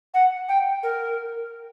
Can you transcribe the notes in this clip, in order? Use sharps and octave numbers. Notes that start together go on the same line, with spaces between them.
F#5
G5
A#4